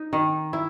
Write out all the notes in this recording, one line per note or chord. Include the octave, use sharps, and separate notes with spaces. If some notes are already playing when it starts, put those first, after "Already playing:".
Already playing: D#4
D#3
E4